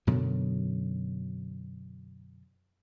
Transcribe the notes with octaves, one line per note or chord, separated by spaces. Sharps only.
F#2 B2 D3 F#3